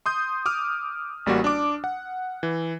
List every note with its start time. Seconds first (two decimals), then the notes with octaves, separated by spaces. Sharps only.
0.06 C6 D#6 G6
0.46 D6 D#6 F6
1.26 A1 G3 A#3 F#4
1.44 D4 D6
1.84 F#5
2.43 E3